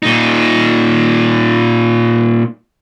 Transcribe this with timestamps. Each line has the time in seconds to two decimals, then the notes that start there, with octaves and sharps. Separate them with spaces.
0.03 A#2 D#4